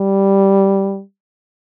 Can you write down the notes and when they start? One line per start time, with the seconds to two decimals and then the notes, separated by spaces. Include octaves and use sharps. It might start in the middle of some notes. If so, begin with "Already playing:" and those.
Already playing: G3